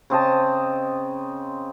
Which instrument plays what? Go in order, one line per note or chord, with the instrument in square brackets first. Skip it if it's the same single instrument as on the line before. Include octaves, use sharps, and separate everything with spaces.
[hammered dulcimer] C#3 C4 D#5 A5